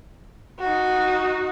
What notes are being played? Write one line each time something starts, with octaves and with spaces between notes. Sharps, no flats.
D#4 F#4